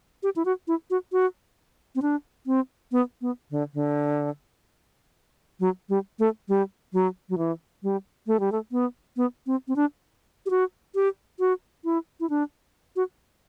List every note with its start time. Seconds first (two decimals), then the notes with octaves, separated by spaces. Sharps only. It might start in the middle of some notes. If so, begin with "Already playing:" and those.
0.23 G4
0.36 E4
0.45 F#4
0.68 E4
0.90 F#4
1.12 F#4
1.95 C4
2.02 D4
2.46 C4
2.92 B3
3.21 B3
3.51 D3
3.74 D3
5.60 F#3
5.89 G3
6.19 A3
6.48 G3
6.93 F#3
7.29 F#3
7.38 E3
7.83 G3
8.27 A3
8.40 G3
8.52 A3
8.72 B3
9.17 B3
9.46 C4
9.68 C4
9.76 D4
10.46 G4
10.50 F#4
10.95 G4
11.39 F#4
11.84 E4
12.20 E4
12.30 D4
12.96 F#4